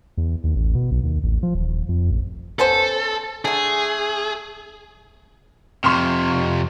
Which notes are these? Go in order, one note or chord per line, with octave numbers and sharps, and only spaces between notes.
E2
D#2
A1
B2
B1
D#2
A1
F3
D#1
F2
A1
B3 C#4 A4 C5
D3 A3 G#4
F2 C3 C6 C#6 F6